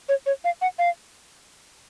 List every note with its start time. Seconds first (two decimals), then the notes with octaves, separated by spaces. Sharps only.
0.09 C#5
0.26 C#5
0.44 F5
0.62 F#5
0.79 F5